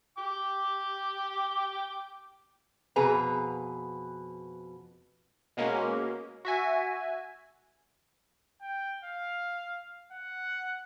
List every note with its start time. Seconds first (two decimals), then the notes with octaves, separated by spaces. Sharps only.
0.18 G5 D6
2.96 F2 B2 G#4 B4 A#5
5.57 B2 G#3 A#3 C#4
6.45 F#4 E5 G#5
8.62 G5
9.04 F5
10.12 F#5